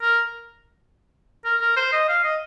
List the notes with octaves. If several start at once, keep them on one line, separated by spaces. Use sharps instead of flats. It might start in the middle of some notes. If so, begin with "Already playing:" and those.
A#4
A#4
A#4
C5
D#5
F5
D#5